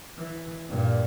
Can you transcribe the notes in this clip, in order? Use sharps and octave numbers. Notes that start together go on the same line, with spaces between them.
E3
G2 A#2